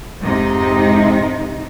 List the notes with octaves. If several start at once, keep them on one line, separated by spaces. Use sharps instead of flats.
F2 G#2 C3 D#4